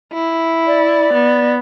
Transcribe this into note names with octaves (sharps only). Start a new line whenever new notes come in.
E4
D5
B3